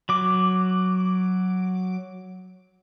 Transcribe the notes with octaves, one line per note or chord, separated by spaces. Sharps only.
F#3 D6